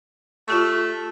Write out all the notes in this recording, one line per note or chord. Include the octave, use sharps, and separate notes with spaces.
A3 F4 G4 C#6